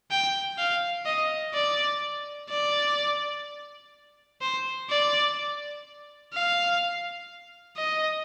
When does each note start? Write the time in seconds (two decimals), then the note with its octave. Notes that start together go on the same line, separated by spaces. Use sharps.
0.11 G5
0.58 F5
1.06 D#5
1.54 D5
2.49 D5
4.41 C5
4.90 D5
6.34 F5
7.77 D#5